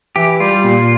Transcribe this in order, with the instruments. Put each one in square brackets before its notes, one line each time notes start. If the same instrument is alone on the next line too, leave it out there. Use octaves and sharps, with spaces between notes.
[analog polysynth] E3 [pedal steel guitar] G4
[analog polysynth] G3 [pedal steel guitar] F4
[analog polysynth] A#2